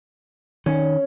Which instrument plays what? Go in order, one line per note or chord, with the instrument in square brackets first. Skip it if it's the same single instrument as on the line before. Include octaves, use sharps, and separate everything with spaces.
[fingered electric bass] D#3 [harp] C#4